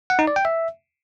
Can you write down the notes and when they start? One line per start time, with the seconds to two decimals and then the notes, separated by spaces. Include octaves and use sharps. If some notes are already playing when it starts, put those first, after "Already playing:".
0.10 F#5
0.19 D#4
0.27 D5
0.36 G5
0.45 E5